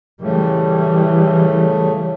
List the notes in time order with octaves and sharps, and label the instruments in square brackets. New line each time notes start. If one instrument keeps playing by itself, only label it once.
[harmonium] A2 C#3 A3 [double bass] E3 G3